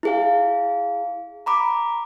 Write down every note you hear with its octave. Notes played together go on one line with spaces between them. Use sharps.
E4 G#4 F5
A#5 B5 D6